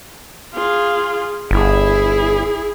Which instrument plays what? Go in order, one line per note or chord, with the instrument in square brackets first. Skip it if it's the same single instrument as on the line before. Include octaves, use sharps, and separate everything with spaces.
[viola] F4 G#4
[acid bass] G1 [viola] E4 G#4